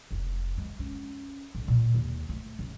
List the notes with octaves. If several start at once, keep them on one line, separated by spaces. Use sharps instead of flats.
F1
G#3
C#4
A1
A#2
D#2
A3
C#3